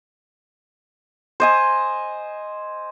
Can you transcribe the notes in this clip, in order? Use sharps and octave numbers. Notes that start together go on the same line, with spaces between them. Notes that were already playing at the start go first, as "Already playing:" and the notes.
C5 D#5 G#5